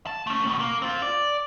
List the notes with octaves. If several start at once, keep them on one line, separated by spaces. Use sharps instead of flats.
A5
A3 C#4
B1 B2
A#3
C4 F4
D5